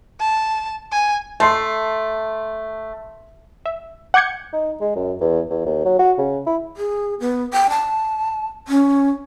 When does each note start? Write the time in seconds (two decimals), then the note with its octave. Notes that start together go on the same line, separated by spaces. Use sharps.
0.20 A5
0.92 G#5
1.40 A3 A5 C6 C7
3.65 E5
4.14 F#5 D6 G6 G#6 C#7
4.53 D#4
4.81 G#3
4.96 F#2
5.21 E2
5.50 E2
5.66 D#2
5.85 F#3
5.99 F#4
6.18 C#3
6.47 E4
6.77 G#4
7.20 B3
7.53 G5
7.70 A5
8.68 C#4